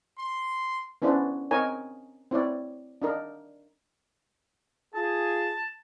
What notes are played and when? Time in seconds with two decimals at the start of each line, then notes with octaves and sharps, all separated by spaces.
0.18 C6
1.02 B3 C#4 D4 E4 B4 C5
1.51 C4 D#4 A#4 C#5 G#5
2.31 C4 E4 C#5 D5
3.02 D4 D#4 A#4
4.95 F4 G#4 A5